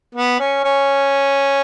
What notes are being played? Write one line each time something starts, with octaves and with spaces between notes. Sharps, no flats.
B3
C#4
C#4